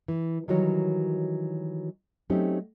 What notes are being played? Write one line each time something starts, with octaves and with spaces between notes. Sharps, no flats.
E3
D#3 E3 F#3 G3 F#4 C#5
F#3 A3 C4 C#4 D#4 G4